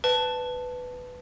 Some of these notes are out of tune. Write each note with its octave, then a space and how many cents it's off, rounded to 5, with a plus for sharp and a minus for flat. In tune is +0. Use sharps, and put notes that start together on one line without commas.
B4 +10 D5 +20 A5 +0